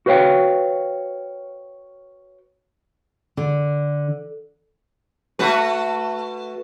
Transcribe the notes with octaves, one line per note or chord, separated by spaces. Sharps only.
F#4 B4 C#5 F5 G5
D3
A3 F#4 B4